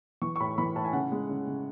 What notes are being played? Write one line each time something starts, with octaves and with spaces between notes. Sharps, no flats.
E3 C#6
C#6
A2 B5
E3 B5
A2 A5
G#5
C#3 F#5
G#3
C#3
C#3